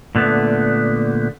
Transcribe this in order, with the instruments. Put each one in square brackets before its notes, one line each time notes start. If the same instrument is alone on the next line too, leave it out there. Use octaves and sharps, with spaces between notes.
[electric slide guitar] A#2 D3 A3 B3